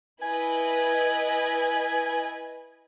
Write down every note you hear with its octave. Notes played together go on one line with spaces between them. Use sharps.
E4 B4 D#5 G#5